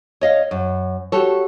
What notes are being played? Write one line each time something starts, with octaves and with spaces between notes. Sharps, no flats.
C#5 D#5 F5
F#2
F#4 G4 A4 C#5